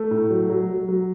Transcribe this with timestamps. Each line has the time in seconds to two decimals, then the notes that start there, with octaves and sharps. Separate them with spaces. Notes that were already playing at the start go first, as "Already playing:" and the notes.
Already playing: A3
0.11 A2
0.30 F#3
0.50 F#3
0.69 F#3
0.88 F#3